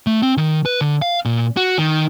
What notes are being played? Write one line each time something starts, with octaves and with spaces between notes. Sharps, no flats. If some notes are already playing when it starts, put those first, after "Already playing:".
A3
C4
D#3
B4
D3
F5
A#2
F#4
D#3